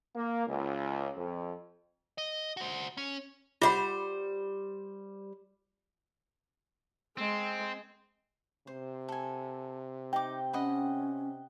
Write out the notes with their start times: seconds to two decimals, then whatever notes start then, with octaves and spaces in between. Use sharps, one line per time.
0.16 A#3
0.48 C#2
1.17 F2
2.18 D#5
2.57 F#4 C5
2.97 C#4
3.62 G3 F4 C5 F#5 B5
7.17 G#3 C4
8.67 C3 C5
9.08 A4 G#5
10.13 D#4 G5 D6
10.53 C#4 D#5 F#5 B5